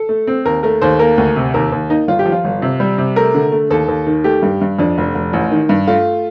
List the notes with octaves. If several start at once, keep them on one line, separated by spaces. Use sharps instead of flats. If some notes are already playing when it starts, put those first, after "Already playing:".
Already playing: A4
A3
C4
D#2 A#4
A3 A#4
D#2 C5
A#3 A#4
D2
C3
D#2 A#4
D#2
A#3 D#4
G1 F4
G4
F3
F4
G1
C3
G3
C3
A3 A#4
D3
A3
D#2 A4
D#2
D#3
A3 G4
G2
G2
F2 D4
F1
F1
A1
D#3
G2
A3 F4